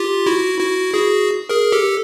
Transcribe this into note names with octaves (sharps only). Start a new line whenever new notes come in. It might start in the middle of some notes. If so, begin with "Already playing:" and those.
Already playing: F4 G4
E4 F#4
E4 F#4
F#4 G#4
G#4 A#4
G4 A4